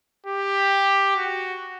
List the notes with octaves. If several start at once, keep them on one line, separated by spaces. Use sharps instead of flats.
G4
F#4